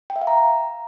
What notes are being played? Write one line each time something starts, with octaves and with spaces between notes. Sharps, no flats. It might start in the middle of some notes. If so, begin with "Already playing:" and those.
G5
E5
F5
A#5